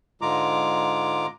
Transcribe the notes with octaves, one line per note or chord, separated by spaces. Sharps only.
G#2 D3 G#3 F4 A#5 D6